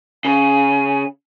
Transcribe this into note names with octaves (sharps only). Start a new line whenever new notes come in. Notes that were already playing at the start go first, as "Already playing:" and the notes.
C#3 G#5